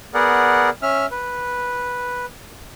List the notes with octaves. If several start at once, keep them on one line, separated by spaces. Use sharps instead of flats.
B3 G#4 A#4 D5 F#5
C#4 E5 F6
B4